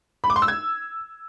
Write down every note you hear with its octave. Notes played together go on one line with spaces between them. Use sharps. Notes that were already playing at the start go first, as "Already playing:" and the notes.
B5
D6
C6
E6
G#6